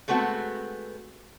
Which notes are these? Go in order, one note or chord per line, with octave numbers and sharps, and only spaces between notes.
G#3 A3 B3 C4 F#4